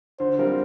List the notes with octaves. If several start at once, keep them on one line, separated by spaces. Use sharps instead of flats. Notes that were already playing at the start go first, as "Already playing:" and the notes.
D3 C5
G3 C4 F4 A#4